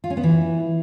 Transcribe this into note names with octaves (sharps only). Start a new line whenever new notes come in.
F4
C#4
B3
E3